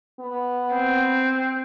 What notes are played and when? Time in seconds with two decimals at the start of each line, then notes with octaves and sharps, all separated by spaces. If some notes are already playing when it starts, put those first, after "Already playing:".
0.20 B3
0.73 C4